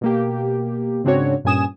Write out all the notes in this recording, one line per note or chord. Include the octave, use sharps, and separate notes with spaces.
B2 A#3 G4
G#2 C#3 C4 D4 F#4 C#5
G2 A#2 C#4 G#5 D#6 E7